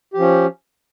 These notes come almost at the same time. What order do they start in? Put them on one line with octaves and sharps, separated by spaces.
G4 F3 C#4